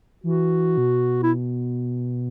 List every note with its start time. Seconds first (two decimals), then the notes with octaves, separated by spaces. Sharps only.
0.24 E3 F#4
0.77 B2
1.23 E4